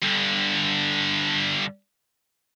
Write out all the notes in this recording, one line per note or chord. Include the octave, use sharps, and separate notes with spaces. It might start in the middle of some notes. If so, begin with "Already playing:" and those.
G2 D3